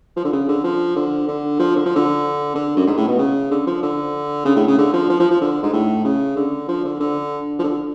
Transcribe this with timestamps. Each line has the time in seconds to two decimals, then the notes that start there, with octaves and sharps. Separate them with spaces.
0.16 F3
0.24 D3
0.33 C#3
0.48 D3
0.64 F3
0.96 D3
1.28 D3
1.59 F3
1.76 D3
1.86 F3
1.96 D3
2.55 D3
2.77 F#2
2.87 G#2
2.97 A2
3.08 B2
3.18 C#3
3.51 D3
3.67 F3
3.83 D3
4.45 C#3
4.56 A2
4.67 C#3
4.78 D3
4.93 F3
5.10 F3
5.20 F3
5.31 F3
5.41 D3
5.63 G#2
5.73 A2
6.04 C#3
6.36 D3
6.68 F3
6.85 D3
7.00 D3
7.59 F3
7.64 D3